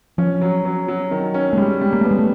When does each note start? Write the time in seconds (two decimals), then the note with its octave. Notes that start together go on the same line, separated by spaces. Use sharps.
0.18 F3 C#4
0.41 F#3
0.65 F#3
0.88 F#3
1.11 D#3
1.34 C#4
1.53 A3
1.57 G3 G#3
1.81 G3
1.93 A#3
2.01 A3 B3
2.11 G#3
2.19 A3